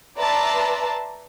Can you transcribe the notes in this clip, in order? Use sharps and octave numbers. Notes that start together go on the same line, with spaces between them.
B4 D5 E5 A5 A#5 C6